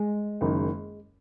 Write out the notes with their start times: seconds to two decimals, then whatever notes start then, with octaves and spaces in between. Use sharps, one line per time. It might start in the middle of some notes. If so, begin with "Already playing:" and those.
Already playing: G#3
0.41 F#1 F#2 D#3